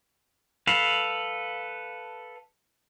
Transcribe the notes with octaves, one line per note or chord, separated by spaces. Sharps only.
A4 B4 F5